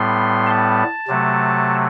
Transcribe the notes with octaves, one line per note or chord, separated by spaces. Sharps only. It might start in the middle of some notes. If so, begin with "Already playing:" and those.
Already playing: A2 G3 B3 C6
A5
C3 F#3 A3